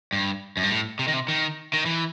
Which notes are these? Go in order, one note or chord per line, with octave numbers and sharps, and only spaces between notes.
G2
F#2
G2
A2
C3
D#3
C3
D#3
D#3
E3